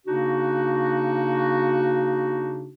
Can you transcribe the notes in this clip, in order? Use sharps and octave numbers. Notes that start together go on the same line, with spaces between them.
C#3 A#3 D4 D#4 F#4